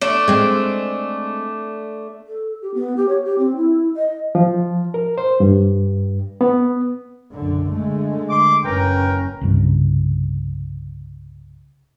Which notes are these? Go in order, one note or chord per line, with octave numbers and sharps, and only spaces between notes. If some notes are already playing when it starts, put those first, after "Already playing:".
A3 D4
G#3 C4
A4
G4
B3
G4
C#5
G4
C4
E4
D#5
F3
A#4
C5
G2
B3
B1 F#2 D3
D3 G#3 A3
C6 D6
F#1 C#4 A#4 B4 G5
C2 G2 C#3